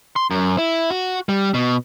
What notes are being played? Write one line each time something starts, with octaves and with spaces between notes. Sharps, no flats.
C6
F#2
E4
F#4
G3
B2